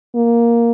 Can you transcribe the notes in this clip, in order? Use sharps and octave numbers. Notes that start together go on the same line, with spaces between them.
A#3